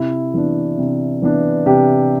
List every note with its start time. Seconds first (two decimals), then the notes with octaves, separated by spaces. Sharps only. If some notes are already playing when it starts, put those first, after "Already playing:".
Already playing: C3 E4
0.34 E3 B3 D4
0.78 C3
1.22 E3 B3 D4
1.66 C3 G4